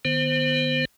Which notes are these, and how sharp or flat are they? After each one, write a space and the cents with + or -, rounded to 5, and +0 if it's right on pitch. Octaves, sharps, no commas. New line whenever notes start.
D3 +45 B3 +0 C5 +0